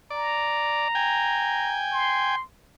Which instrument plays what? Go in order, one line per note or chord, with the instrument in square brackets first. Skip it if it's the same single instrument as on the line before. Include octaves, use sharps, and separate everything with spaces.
[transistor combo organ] D5 [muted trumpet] A#5
[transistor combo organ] G5 G#5
[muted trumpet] C6